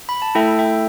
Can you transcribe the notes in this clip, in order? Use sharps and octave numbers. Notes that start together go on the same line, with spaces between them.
B5
A5
A3 E4 A4 E5 G5
E5 G5